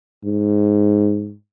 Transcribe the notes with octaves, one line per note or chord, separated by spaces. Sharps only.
G#2